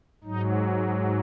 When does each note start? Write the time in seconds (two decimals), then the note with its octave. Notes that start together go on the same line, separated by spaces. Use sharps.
0.24 G#2 F#3 D#4
0.82 D#4